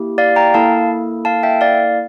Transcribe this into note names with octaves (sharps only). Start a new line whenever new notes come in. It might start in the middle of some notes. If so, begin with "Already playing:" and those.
Already playing: A#3 E4 G4
D5 F5
G5 A#5
A#3 E4 A4 F5 A5
F5 A5
E5 G5
D5 F5